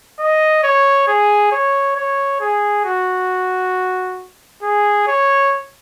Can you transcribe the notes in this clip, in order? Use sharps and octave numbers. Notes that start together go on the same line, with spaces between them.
D#5
C#5
G#4
C#5
C#5
G#4
F#4
G#4
C#5